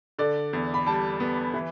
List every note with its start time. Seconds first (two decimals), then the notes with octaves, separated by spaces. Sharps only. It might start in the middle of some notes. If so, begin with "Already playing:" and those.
0.19 D3 D5
0.53 E2
0.74 B5
0.86 G3 A5
1.20 B3
1.54 E3